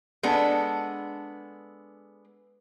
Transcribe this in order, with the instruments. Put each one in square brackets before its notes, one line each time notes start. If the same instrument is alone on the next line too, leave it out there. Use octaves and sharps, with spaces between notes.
[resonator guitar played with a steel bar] G#3 B3 D4 A4